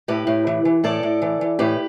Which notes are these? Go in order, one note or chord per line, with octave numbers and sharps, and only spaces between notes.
A2 G4 B4
A2
E3
E3
A2 A4 D5
A2
E3
E3
A2 G4 B4